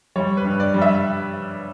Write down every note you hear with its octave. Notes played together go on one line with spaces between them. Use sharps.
G3 C#5
B4
G2
D5
G3
E5